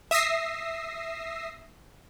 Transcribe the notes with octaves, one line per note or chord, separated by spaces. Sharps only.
E5 D#6 E6 A#6 C7